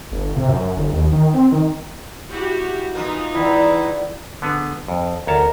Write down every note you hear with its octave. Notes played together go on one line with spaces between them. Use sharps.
G1
C3
F#2
G1
D#2
D#3
C4
D#3
E4 F#4 G4
E3 A#3 D#4 F4
E2 E4
D3 B3 G#4
F2
D2 A#4 C#5 A5